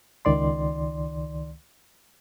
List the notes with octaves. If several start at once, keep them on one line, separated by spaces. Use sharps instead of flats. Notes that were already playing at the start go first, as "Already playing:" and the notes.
C#2 D#3 D5 C6